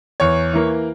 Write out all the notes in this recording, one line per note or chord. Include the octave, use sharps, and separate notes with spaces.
E2 C#5
E3 A#3